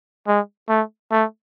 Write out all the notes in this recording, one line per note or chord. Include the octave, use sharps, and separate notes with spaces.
G#3
A3
A3